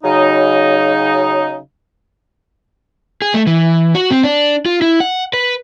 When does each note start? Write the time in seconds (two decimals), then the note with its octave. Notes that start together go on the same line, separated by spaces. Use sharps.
0.03 C#3 F#3 D#4
3.22 G#4
3.34 A3
3.47 E3
3.95 F#4
4.11 C4
4.23 D4
4.65 F4
4.82 E4
5.00 F#5
5.33 B4